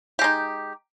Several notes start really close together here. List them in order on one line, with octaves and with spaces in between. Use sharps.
G4 G#3 D#4